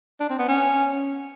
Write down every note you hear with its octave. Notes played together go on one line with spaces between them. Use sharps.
D4
C4
B3
C#4